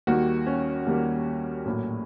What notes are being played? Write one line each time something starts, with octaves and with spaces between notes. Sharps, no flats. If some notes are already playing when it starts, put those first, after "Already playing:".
D#2 D#3 G3 A#3 F#4
C#4
D#2 D#3 G3 A#3
A#1 A2 F#3 A#3